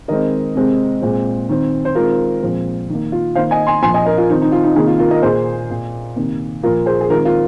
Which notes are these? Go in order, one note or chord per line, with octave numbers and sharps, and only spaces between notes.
D#3 G#3 C4 A#4 D#5
C3 G#3 C4
A#2 G#3 C4
D#3 C4
C5
D#3 G#3 C4 F4 A#4
A#2 F3 G#3 C4
D#3 A#3
F4
D#3 A#3 C5 F5
D#5 G#5
G#5 C6
A#2 F3 A#3 G#5 C6
D#5 G#5
A#4 D#5
F4
D#3 C4 D#4
D#4
F4
D#4
C3 D#3 A#3 D#4 G#4
F4
F4 A#4
A#4 D#5
A#2 A#3 G#4 C5
A#2 A#3
C3 D#3 A#3
A#2 F3 A#3 F4 A#4
G#4 C5
G#4
D#3 G#3 C4 F4 A#4
F4 A#4